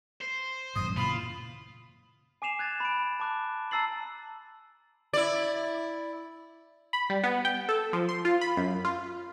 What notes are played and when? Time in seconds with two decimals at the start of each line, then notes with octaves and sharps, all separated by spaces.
0.21 C5
0.76 D#1 F#2 A2 D#6
0.97 A#2 C#3 E3 F4 B5
2.42 G#5 D6 C7 E7 F7
2.59 F#6 G#6 A6
2.80 B5 D7
3.20 A5 D6 F#6
3.71 A5 A#5 E6 A6 C7 F#7
5.13 E4 D5
6.93 B5
7.10 G3
7.24 B3
7.45 G5
7.69 A4
7.93 F3
8.09 C6
8.25 F4
8.41 B5
8.57 F#2
8.85 F4